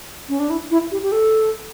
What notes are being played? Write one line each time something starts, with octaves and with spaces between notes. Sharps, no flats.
C#4
D4
E4
E4
G4
G4
A4